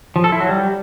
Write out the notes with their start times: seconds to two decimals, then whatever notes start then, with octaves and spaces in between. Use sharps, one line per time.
0.16 F3
0.24 A4
0.32 E4
0.41 F#3
0.49 G3